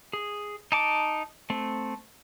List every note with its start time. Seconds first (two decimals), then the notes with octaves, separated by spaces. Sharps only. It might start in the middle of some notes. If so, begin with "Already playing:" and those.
0.13 G#4
0.72 D#4 A5 D6
1.50 A3 C4